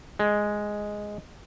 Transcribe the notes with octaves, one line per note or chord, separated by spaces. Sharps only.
G#3